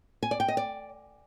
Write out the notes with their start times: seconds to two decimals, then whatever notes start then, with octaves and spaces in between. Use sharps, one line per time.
0.23 G#5
0.31 D5
0.40 G5
0.48 D#5
0.57 D5